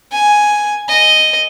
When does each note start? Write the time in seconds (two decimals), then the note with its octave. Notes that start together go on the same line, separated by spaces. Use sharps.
0.12 G#5
0.89 D#5